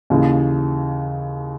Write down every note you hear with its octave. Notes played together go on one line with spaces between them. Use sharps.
D#2 C#3 E3